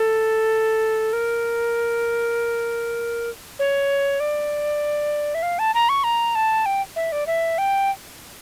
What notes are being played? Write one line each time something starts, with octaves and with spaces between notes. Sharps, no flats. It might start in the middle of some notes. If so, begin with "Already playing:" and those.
Already playing: A4
A#4
C#5
D5
E5
F5
A5
A#5
C#6
A#5
A5
G5
E5
D5
E5
G5